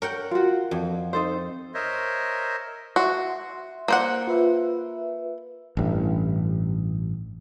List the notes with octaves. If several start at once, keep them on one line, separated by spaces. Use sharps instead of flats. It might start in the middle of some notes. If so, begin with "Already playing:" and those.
A#4 C#5 F#5 G5
F4 F#4
F2
D#4 A4 C5
A#4 C5 C#5 D#5 E5
F#4 E5 C6
A#3 C5 F#5
F4 B4 E5
A1 G2